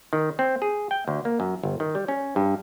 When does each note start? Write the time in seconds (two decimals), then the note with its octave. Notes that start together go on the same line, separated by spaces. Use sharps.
0.13 D#3
0.39 C4
0.62 G#4
0.91 G5
1.08 D2
1.25 A#3
1.40 F#2
1.63 G1
1.80 D#3
1.95 G3
2.08 C#4
2.36 G2